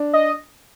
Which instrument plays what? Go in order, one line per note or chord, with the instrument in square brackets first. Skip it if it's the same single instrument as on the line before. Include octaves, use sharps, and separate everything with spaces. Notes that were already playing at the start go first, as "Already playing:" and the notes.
Already playing: [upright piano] D4
[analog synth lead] D#5